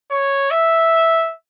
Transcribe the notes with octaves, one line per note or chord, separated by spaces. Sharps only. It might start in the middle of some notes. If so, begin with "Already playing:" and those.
C#5
E5